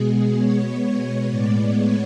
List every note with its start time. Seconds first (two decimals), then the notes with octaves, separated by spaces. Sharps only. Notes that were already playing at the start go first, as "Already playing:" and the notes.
Already playing: B2 G#3 B3 G#4
0.38 C#5
1.28 A2 G#3 B3 D5
1.75 C#5